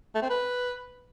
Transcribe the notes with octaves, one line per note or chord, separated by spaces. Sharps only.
A3
C4
B4